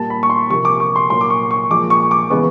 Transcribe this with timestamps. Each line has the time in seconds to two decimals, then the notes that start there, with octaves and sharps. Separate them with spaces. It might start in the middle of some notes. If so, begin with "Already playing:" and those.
Already playing: A#2 G3 A#3 A5
0.10 B5
0.23 C#6
0.30 C6
0.50 C3 F3 A#3 C#6
0.65 D6
0.80 C#6
0.96 C6
1.10 A#2 F#3 A#3 C6
1.21 D6
1.30 C#6
1.51 C#6
1.70 A#2 F3 G#3 D6
1.90 C#6
2.11 D6
2.30 C#3 E3 G#3 B3 C#6